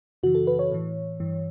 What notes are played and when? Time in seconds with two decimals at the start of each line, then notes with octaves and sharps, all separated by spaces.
0.23 F#2 C#3 E3 F#4
0.35 A4
0.47 B4
0.59 C#5
0.72 A2 E3
1.20 G2 E3